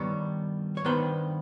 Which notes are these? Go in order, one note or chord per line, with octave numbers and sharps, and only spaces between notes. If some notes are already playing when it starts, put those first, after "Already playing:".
Already playing: G2 D#3 G3 B3 C#5
C#5
G2 D#3 G3 B3 C5